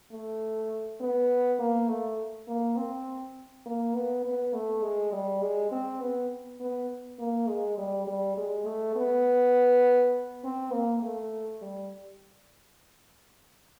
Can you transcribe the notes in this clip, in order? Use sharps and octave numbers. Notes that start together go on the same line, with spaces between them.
A3
B3
A#3
A3
A#3
C4
A#3
B3
B3
A3
G#3
G3
G#3
C4
B3
B3
A#3
G#3
G3
G3
G#3
A3
B3
C4
A#3
A3
G3